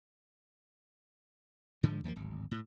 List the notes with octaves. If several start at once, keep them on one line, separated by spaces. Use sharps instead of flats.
G#2 D3 F3 G#3
D#2 F3 G#3 A#3
D1 G#1
A2